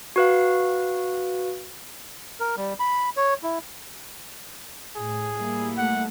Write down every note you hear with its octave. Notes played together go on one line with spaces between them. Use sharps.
F#4 B4 F5
A#4
G3
B5
C#5
E4
A2 G#4
G3 A#3 E4
A3 F#5